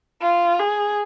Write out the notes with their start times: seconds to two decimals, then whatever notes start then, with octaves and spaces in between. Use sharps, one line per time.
0.21 F4
0.59 G#4